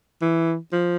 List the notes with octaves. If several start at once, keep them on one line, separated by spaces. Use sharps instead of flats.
E3
F3